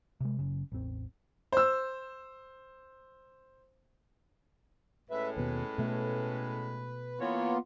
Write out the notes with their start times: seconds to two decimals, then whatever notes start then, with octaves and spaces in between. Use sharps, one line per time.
0.20 C3 G#3
0.39 F#1 C#3
0.72 A1 E2 C4
1.52 C5 E6
5.10 A2 G#3 C#4 B4 E5
5.37 D#2 B2 B4
5.78 B2 A3
7.20 E3 A#3 B3 F4 C#5